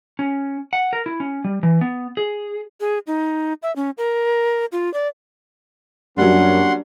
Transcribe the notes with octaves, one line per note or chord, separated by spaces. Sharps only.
C#4
F#5
A#4
E4
C#4
G3
E3
B3
G#4
G#4
D#4
E5
C#4
A#4
F4
D5
F#2 F#3 G3 A#3 C#4 D4 F#5 C6